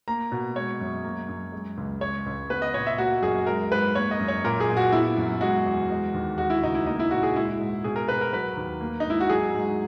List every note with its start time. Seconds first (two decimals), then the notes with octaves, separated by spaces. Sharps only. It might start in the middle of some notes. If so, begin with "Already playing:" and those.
0.08 A#3 A#5
0.32 B2
0.55 G#3 C#5
0.80 F#2
1.04 A#3
1.29 F#2
1.52 G#3
1.77 C#2
2.01 G#3 C#5
2.26 C#2
2.49 B3 B4
2.62 D#5
2.74 A#2 C#5
2.86 E5
2.98 A#3 F#4
3.22 F#2 G#4
3.46 G#3 A#4
3.71 G#2 B4
3.95 A#3 C#5
4.11 D#5
4.20 F#2
4.28 C#5
4.44 A#2 A#4
4.60 G#4
4.68 A#2
4.77 F#4
4.92 B3 E4
5.17 F#2
5.41 G#3 F#4
5.66 E2
5.90 G#3
6.14 D#2
6.38 G#3 F#4
6.50 E4
6.63 C#2 D#4
6.74 E4
6.86 A#3 D#4
6.99 E4
7.11 A#2 F#4
7.23 G#4
7.36 G#3 E4
7.59 G#2
7.84 B2 G#4
7.96 A#4
8.09 B2 B4
8.21 A#4
8.33 F#3 B4
8.57 D#2
8.81 A#3
9.00 D#4
9.05 G#2 E4
9.20 F#4
9.30 F#3 G#4
9.54 G#2